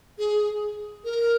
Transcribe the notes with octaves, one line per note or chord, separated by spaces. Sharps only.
G#4
A#4